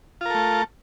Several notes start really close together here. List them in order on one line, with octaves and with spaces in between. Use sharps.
F4 A#4 A4 A3